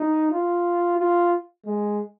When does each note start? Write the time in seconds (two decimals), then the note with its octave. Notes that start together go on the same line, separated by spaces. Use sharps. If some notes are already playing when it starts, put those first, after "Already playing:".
Already playing: D#4
0.31 F4
0.99 F4
1.66 G#3